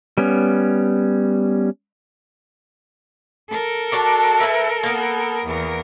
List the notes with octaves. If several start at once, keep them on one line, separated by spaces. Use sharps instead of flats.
G3 B3 C#4
A4 A#4
D4 F#4
E4 B4 E5
A#3 B3
E2 A#4